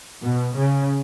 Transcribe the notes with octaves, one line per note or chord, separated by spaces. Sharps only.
B2
C#3